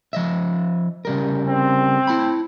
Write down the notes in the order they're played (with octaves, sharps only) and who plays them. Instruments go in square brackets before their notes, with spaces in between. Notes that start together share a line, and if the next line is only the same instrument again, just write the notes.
[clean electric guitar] F3 D#5 E5
C#3 G3 A#4
[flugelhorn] C4
[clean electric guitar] E4 A5 B5